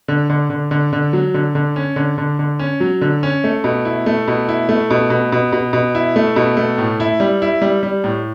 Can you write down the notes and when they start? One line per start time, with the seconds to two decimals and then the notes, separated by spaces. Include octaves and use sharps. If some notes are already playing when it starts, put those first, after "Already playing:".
0.08 D3
0.30 D3
0.50 D3
0.71 D3
0.93 D3
1.13 F#3
1.34 D3
1.55 D3
1.76 C#4
1.96 D3
2.18 D3
2.39 D3
2.59 C#4
2.80 F#3
3.01 D3
3.23 C#4
3.44 A3
3.64 B2
3.85 E4
4.06 A3
4.28 B2
4.49 E4
4.69 A3
4.90 B2
5.10 B2
5.32 B2
5.52 B2
5.73 B2
5.95 E4
6.16 A3
6.36 B2
6.57 A3
6.78 A2
7.00 E4
7.20 G3
7.42 E4
7.62 G3
7.83 G3
8.04 A2